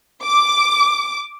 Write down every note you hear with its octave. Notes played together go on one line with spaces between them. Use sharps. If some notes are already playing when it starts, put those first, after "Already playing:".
D6